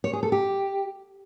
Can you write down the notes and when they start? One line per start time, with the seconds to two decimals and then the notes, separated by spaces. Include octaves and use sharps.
0.04 C#5
0.13 G#4
0.23 A4
0.32 G4